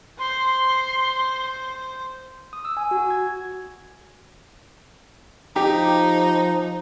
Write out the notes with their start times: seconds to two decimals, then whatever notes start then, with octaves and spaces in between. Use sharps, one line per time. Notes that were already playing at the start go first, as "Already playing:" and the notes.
0.19 C5 C6
2.53 D#6
2.65 E6
2.77 G#5
2.91 F#4
3.10 G#6
5.56 F3 D#4 G4